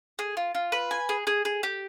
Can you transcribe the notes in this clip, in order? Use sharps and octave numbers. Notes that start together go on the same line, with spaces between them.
G#4
F4
F4
B4
G#5
G#4
G#4
G#4
G4